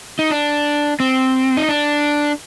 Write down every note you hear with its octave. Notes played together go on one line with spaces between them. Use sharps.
D#4
D4
C4
D#4
D4